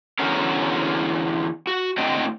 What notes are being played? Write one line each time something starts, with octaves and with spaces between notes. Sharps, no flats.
E2 D3 C#4 F#4 A#4
F#4
A2 D3 C4 F#4 D#5 G5